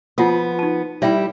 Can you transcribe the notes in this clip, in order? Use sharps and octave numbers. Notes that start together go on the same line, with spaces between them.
F3 B3 F4 F#5 D#6
D#4 A5
G3 E4 D5 E5 G5